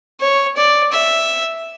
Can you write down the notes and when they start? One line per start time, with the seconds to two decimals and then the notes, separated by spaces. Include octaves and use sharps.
0.21 C#5
0.57 D5
0.92 E5